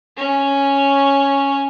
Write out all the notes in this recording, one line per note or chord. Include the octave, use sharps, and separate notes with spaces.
C#4 C#5